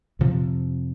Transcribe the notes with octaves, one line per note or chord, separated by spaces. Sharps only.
F2 C3 F3